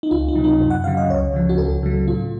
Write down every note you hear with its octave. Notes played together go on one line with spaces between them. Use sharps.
D#4
C#2 F4
D#4
C3 F#3
D#4
F#2
F#5
C#3 F#3 F5
D#5
C#2 C#5
C#3 F3
F#4
C#2 A4
C#3 F#3
A2 F4